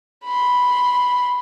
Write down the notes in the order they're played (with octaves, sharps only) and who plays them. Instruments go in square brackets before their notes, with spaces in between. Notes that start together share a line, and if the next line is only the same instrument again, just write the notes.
[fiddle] B5 C6